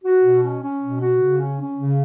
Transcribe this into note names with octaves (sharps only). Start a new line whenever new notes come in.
F#4
B2
C#4
C#4
B2
F#4
C#3
C#4
C#4
C#3